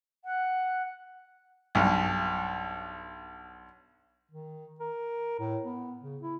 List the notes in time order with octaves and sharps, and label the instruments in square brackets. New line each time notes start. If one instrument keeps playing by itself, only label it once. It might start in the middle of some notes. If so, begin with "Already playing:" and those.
[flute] F#5
[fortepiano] B1 G2
[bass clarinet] D#3
A#4
A2
B3
C#3
E4